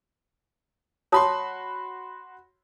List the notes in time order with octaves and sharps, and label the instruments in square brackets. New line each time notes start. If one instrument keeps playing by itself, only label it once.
[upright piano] F#4 B5 C6 [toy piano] C#5 A5 D#6